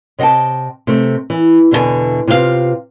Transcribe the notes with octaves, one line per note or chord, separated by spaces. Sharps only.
C3 D#5 F#5 G5 A5
C3 A3
E3
E2 B2 D3 F#4 E5 G#5
C3 F4 B4 C#5 F5